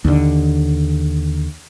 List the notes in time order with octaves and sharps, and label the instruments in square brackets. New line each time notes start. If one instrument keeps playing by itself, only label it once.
[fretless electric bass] D#2 D3